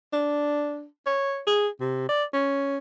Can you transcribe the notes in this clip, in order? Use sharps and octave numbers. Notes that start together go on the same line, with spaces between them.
D4
C#5
G#4
C3
D5
C#4